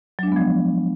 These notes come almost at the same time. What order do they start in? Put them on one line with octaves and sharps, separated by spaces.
F#3 D4 G#3 B3 F3